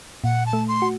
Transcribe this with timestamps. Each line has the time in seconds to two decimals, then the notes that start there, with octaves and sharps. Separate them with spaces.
0.24 A#2 F#5
0.46 A5
0.53 A3
0.68 C6
0.82 F#4